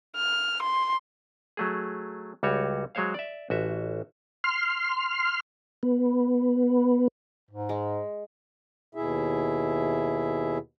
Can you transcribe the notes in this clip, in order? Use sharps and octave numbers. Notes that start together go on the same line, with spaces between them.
F6
C6
F#3 A3 G#4
C#2 G3 F#4 C#5
F#3 G#3 C5 C#5 F5
D5 E5
A1 F#4 E5
C6 F6
B3
G#2
G#3
D#2 B2 E4 G#4 E5